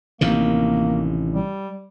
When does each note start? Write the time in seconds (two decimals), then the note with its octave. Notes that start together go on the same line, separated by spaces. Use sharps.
0.21 A1 C3 D#3 A#3
1.35 G3